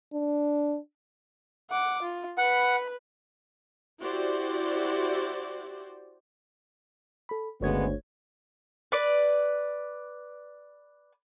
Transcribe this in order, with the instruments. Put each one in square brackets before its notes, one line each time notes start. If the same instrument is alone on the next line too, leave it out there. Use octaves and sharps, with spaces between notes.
[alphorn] D4
[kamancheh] F#5 D6
F4
[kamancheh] B4 B5 [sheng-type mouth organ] F#5
[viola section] E4 F#4 G4 C5 D5
[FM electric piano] A4 B5
[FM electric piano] G1 C#5 G#6 [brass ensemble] D2 [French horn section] C#3 G#3 B3
[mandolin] B4 D5